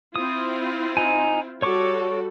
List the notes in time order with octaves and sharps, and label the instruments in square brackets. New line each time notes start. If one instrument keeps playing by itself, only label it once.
[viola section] C4 E4 F4 [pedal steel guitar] D#6
[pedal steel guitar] D#4 G#5
[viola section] G3 F#4 A4 [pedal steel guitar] C#5 C#6 D6